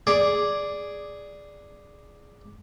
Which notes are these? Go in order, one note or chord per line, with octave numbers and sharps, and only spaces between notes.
G#4 D5